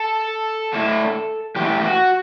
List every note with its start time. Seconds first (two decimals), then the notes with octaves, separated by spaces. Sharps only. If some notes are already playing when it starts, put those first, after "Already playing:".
Already playing: A4
0.73 D3 A3 E4
1.56 E3 A3 E4 G4
1.84 F#4